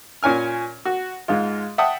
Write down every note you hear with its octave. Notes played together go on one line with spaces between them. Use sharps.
A#2 C#4 G#5 F6
F#4
G#2 G#3 F4
E5 F#5 G5 A5 D#6